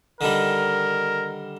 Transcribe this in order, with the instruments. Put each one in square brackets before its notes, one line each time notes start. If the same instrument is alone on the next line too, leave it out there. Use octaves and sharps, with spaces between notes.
[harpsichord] D3 D#3 G3 [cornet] A#4